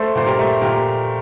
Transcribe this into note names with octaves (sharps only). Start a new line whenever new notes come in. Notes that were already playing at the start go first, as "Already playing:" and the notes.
Already playing: A3 A4 C5
A#2 C5
G4 A#4
A3
A#2 G4 A#4